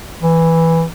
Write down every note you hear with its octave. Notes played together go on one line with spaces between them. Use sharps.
E3